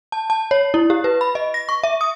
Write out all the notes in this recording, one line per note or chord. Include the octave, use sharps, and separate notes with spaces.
A5
A5
C#5
E4
G4
B4
B5
D#5
A#6
C#6
E5
D#6